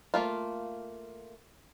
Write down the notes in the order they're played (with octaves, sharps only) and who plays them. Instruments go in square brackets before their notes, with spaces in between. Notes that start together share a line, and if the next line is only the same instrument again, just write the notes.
[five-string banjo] A3 A#3 F4